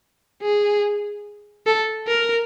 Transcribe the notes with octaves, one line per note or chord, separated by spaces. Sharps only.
G#4
A4
A#4